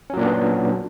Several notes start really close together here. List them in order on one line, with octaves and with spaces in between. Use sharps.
C#4 F#3 A#2 D4 B3